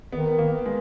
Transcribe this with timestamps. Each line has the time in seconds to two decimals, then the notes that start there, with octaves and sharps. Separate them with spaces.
0.12 D#3 B3
0.39 A#3
0.66 G#3